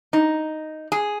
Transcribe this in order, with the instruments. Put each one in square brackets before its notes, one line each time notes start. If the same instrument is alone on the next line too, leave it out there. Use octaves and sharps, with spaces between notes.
[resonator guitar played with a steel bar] D#4
G#4